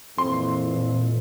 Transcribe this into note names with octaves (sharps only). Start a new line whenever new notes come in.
F2 A#2 E3 C6